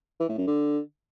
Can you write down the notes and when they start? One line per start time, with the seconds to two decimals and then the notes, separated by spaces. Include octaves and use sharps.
0.20 E3
0.29 A2
0.38 F#2
0.47 D3